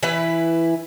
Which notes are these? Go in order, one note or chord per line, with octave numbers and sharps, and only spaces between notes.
E3 E4 B4